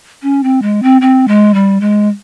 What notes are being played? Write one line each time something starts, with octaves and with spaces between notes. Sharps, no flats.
C#4
C4
G#3
C4
C4
G#3
G3
G#3